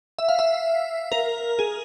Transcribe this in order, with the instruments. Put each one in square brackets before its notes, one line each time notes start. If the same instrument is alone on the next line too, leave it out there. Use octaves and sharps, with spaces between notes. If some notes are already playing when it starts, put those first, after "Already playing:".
[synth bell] E5
F5
E5
A#4
G#4